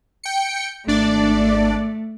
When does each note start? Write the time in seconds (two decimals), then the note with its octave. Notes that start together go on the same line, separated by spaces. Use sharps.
0.23 G5 C#7
0.87 G#1 A3 D4 D5